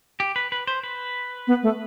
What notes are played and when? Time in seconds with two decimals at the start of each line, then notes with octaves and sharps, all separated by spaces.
0.20 G4
0.36 B4
0.52 B4
0.67 C5
0.83 B4
1.47 B3
1.63 A3